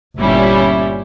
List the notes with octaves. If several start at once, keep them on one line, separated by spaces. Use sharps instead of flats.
G1 A#2 G3 C#4 E4